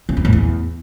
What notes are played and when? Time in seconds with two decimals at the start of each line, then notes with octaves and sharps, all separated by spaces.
0.09 C#3
0.17 F2
0.25 A2
0.33 E2